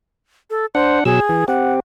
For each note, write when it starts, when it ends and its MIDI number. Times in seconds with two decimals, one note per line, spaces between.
0.50 0.66 69
0.75 1.04 62
0.75 0.99 72
0.75 1.04 78
1.05 1.20 47
1.05 1.20 54
1.05 1.45 68
1.05 1.20 88
1.29 1.44 52
1.48 1.80 60
1.48 1.80 67
1.48 1.73 78